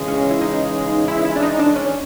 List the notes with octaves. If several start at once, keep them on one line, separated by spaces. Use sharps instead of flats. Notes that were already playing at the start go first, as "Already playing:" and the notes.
Already playing: C#3 E3 G#3
C#4
E4
D#4
E4
E4
D4
D#4
D4
C#4